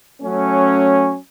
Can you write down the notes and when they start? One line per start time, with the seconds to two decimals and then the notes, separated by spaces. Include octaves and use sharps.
0.21 F#3 A3 C#4